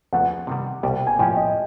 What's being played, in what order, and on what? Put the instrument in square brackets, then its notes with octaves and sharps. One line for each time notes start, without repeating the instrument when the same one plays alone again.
[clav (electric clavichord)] E2 C#3 F3 A3 [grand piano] F#5
[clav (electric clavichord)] C3 D#3 G3
[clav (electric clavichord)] C2 B2 G3 [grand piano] G5
[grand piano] G#5
[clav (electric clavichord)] A2 F3 A#3 C#4 [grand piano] G5
[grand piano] D#5